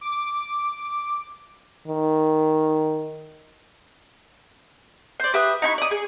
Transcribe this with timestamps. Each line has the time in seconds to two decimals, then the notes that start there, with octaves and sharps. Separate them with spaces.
0.01 D6
1.88 D#3
5.20 C5 D5
5.34 G4 B4 E5 D#6
5.62 D#4 E4 C#6
5.78 D5 D#6
5.91 G#4